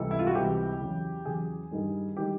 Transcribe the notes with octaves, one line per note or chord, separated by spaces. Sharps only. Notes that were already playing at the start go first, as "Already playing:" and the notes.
Already playing: C#2 C3 E3 G3 A4
E4
F4
F#4
C#2 C3 E3 G3 G4
E2 C#3 F#3
E2 C#3 F#3 G#4
G2 D#3 G3
D#3 G3 G4